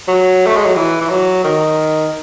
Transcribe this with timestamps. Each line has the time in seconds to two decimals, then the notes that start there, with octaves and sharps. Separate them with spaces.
0.08 F#3
0.47 A3
0.57 G#3
0.66 F#3
0.76 E3
1.01 E3
1.10 F#3
1.44 D#3